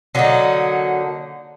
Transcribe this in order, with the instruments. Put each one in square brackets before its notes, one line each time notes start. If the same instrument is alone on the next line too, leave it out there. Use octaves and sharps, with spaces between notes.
[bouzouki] D3 F#3 A#3 D#4